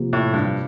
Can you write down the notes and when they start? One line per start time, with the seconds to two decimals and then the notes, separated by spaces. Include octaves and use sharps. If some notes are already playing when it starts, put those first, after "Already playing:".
Already playing: C3 F3 A#3
0.13 A2
0.34 G2